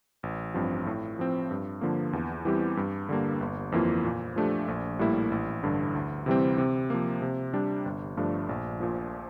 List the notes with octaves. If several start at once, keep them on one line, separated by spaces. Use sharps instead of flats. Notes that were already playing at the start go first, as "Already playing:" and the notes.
A1
G2 F3 C4
A2
F3 C4
G2
D3 F3 A#3
E2
E3 G3 C4 G4
G2
D3 G3 A#3
G1
F2 E3 A#3 F4
A#2
F3 A3 D4 G4
A#1
A2 G3 A#3 E4
A1
G2 D3
D2
C3 E3 G3 C4
C3
F3 A#3
C3
G3 D4 G4
G1
G2 F3 A3 D4
A#1
A#2 F3